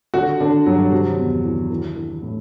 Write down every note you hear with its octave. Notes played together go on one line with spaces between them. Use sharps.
D3 F#4
D3 D4
G2 F#3
C3 F#3
E2
E3
E3
E3
A2